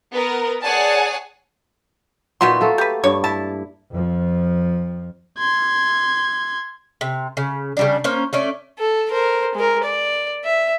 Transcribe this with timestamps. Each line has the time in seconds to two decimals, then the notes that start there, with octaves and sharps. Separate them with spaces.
0.12 B3 A#4
0.62 G#4 C#5 D5 F#5 G#5 A5
2.41 A#2 D#3 E3 B3 F#4 C6
2.60 A3 A#3 A4
2.78 G4 B4
3.04 G2 C#5 D5
3.24 E4 A5
3.92 F2 F3
5.38 C6 G#6
7.01 C3
7.37 C#3
7.77 C#3 G3 D4
8.04 A#3 C#4 C5
8.33 A3 C#4 D5
8.79 A4
9.11 A#4 C5
9.55 G#3 A#4
9.84 D5
10.44 E5